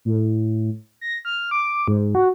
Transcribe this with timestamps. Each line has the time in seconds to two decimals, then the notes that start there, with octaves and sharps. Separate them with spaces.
0.05 A2
1.01 A#6
1.25 F6
1.51 D6
1.88 G#2
2.15 F#4